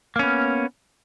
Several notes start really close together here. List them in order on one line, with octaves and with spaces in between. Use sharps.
A#3 C#4 B3